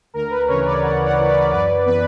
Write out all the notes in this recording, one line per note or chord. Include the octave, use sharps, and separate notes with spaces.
D2 A#4
B4
C#3 E3 A#4 C#5
B4 D5
D2 D5 F#5
D5 F#5
C#3 E3
B4 D5
F#2 B4 D5
E3 B3 B4